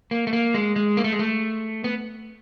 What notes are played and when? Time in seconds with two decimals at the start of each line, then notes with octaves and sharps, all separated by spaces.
0.11 A#3
0.27 A3
0.33 A#3
0.54 G#3
0.76 G#3
0.97 A#3
1.04 A3
1.12 G#3
1.19 A3
1.84 B3